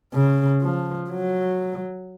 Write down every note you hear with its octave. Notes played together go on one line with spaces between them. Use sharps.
C#3
F3
F#3